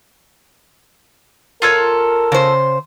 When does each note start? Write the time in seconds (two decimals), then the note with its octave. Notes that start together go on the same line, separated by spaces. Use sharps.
1.62 F4 A4 A#4 C#5
2.32 C#3 C5